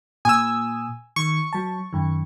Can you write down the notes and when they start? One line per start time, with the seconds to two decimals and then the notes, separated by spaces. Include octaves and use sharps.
0.25 A#2 G#5 D#6 E6
1.16 D#3 C#6
1.53 F#3 A5
1.93 F#2 D#3